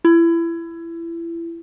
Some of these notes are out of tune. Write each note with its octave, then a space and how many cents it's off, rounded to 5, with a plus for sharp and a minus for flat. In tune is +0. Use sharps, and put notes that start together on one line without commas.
E4 +25